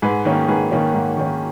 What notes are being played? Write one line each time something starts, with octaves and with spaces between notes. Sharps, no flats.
G#2 G#4 B4
D#3 A#3 C#4
G#2 G#4 B4
D#3 A#3 C#4
G#2
D#3 A#3 C#4